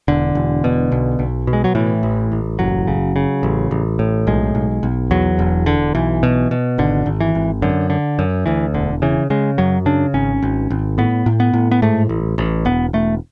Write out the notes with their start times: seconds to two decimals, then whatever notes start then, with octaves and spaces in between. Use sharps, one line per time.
0.08 E1 D3
0.35 E1
0.64 B2
0.92 B1
1.19 B1
1.47 B2
1.53 G#3
1.64 F#3
1.75 A2 E3
2.03 A1
2.32 A1
2.59 F#1 F#3
2.88 C#3
3.16 C#3
3.43 A1
3.71 A1
3.99 A2
4.27 B1 G#3
4.55 B1
4.83 B1
5.11 E2 F#3
5.39 E1
5.66 D3
5.95 B1 E3
6.23 B2
6.51 B2
6.78 G#1 D3
7.06 G#1
7.20 E3
7.35 G#1
7.62 F#2 D3
7.90 D3
8.19 F#2
8.46 D2 E3
8.74 E1 D3
9.02 C#3 E3
9.30 C#3 G#3
9.58 F#2 F#3
9.86 C#3 D4
10.14 G#1 C#4
10.43 G#1
10.70 G#1
10.98 A2 B3
11.26 A2
11.40 B3
11.53 A2
11.71 B3
11.82 G#2 A3
12.09 A1
12.38 A1
12.65 E1 B3
12.93 E1 A3